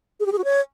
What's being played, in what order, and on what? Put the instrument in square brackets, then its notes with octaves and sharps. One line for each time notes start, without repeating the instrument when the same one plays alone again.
[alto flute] G#4
G4
G#4
F#4
C#5